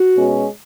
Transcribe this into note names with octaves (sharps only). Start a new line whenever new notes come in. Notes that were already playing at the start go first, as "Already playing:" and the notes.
Already playing: F#4
B2 G#3 C#4